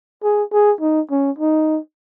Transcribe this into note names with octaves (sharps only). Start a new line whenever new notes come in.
G#4
G#4
D#4
C#4
D#4